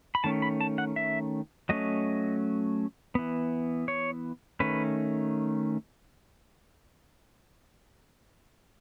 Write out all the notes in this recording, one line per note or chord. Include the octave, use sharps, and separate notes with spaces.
B5
D#3 A3 C#4 A5
B5
A5
F#5
E5
F#3 A3 C#4 D#5
E3 B3
C#5
D#3 A3 C#4 B4